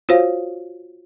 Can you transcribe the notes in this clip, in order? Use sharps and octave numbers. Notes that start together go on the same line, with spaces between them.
F4 F#4 C5 C#5 F5